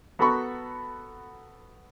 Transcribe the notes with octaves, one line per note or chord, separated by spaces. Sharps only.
B3 F#4 A4 A#5 B5 C#6